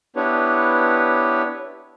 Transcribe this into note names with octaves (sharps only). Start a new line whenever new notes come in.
B3 D4 E4 G4 B4 C#5